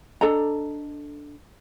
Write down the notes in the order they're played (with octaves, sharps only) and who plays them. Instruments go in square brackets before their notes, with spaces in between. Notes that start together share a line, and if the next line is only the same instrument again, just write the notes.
[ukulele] D4 A4 D#5 A#5